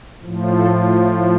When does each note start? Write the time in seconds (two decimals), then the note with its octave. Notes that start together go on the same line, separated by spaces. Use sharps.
0.21 A2 F3
0.56 F4 A4